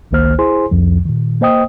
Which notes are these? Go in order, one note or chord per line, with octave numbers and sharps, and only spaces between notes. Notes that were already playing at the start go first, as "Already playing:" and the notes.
G#1 C#2 D#3 A#3 C5 F6
E4 G#4 C5 G#5 C6
C2 F2 F3
A#2 D#3
A#3 C5 D#5 G5 D#6